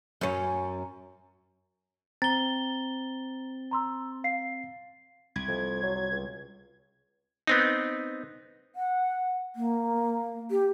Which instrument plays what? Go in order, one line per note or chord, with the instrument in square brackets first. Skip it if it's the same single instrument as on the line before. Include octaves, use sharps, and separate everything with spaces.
[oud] F#2 C#4
[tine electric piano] C4 [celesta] A#5 [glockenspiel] A6 G7
[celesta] A#5 C6 E6
F5 C7
[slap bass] C2 [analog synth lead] G#6
[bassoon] F2
F#3
F#3
C#2
[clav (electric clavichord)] B3 C4 D#4
[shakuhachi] F#5
A#3
G4